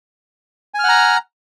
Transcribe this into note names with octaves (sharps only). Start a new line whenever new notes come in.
F#5 G#5 A#5 F6